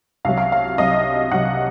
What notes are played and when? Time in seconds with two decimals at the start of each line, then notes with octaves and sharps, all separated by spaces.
0.25 C2 C3 F#3 F5
0.38 F5
0.52 F5
0.78 C2 C3 F#3 D#5
1.31 C2 C3 F#3 F#5